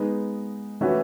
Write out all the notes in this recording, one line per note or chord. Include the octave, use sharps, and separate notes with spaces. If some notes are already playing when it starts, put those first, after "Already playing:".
Already playing: G#3 B3 D#4
E3 A3 C#4 F#4 B4